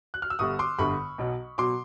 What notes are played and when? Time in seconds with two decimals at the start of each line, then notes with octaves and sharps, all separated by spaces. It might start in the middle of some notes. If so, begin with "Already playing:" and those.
0.14 F#6
0.22 F6
0.30 E6
0.39 G1 G2 D3 C#6 D#6
0.59 C6 D6
0.78 G1 G2 D3 B5 C#6
1.18 B1 B2 F#3
1.58 B2 F#3 C6 D6